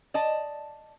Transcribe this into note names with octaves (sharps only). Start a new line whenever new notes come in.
D5 D#5 A5